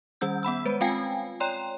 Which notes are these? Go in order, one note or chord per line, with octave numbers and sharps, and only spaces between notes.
D#3 G3 C#4 E6 G6
B3 F#5 B5 E6
G#3 B4 C5
G#3 C4 F4 F5 G5 G#5
C#5 D5 G5 A#5 C6